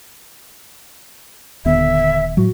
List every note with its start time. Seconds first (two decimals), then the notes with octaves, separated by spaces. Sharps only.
1.65 D#1 D#2 D3 B3 E5
2.37 A2 F#3 F#4